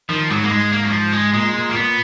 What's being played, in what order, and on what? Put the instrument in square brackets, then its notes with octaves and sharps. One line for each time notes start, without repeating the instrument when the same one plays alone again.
[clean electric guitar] D#3 [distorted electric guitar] F3
[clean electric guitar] G#2 [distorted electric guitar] F#3
[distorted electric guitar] A#3
[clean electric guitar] G#2 [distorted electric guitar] G#3
[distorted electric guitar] A#3
F#3
F3
G#3
[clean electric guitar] A#2 [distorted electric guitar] G#3
[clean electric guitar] A#2
[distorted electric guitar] A#3
[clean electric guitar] A#2 [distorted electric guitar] B3